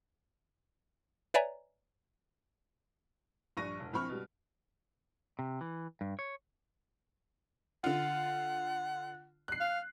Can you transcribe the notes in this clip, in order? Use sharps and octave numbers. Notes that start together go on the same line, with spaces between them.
B4 C#5 D5 E5 G#5 A#5
A#1 G2 D4 C#6 A#6 D#7
E1
A#1 C4 E4 B5 C#6 F6
B2 G3
C3
E3
G2
C#5
D3 F4 F#5
F#6 C7
F5